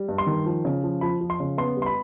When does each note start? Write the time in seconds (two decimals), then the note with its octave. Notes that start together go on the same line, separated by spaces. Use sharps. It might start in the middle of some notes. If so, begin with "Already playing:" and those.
Already playing: G3
0.09 G2
0.18 C6
0.27 D#3
0.46 F3
0.65 C#3
0.84 F3
1.01 F3 B5
1.21 F3
1.30 C6
1.40 C#3
1.58 B3 C6
1.77 G3
1.82 C6
1.86 B5